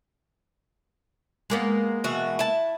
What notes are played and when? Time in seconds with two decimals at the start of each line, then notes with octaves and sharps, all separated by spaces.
1.50 G#3 A#3 B3
2.04 B2 E3 F#4
2.39 E4 A5